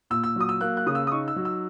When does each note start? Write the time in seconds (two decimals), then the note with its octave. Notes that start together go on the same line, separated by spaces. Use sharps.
0.10 A#2 E6
0.24 E6
0.36 F#3 D#6
0.49 E6
0.61 A#3 F#6
0.77 F#6
0.86 C#3 D#6
0.95 E6
1.07 D#6
1.12 D#4 C#6
1.28 E6
1.36 F#3
1.45 E6